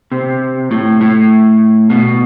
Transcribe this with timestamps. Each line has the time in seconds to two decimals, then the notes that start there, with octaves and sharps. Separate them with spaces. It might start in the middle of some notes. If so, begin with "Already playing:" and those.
0.12 C3
0.71 A2
1.01 A2
1.90 B2